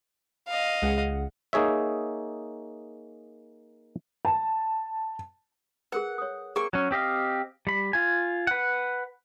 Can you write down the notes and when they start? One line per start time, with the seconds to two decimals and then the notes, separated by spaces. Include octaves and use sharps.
0.48 D#5 F5
0.82 C#2 G#4 F#5
1.53 A#3 D#4 G#4 C#5 E5
4.25 A5
5.92 G#4 A#4 B4 F#5
6.18 C#5 D#6
6.56 A#3 C4 G#4 C#6
6.73 F#3 C#4
6.91 C4 G4 D#5 F5
7.67 G3 B5
7.93 F4 G#5
8.47 B4 F#5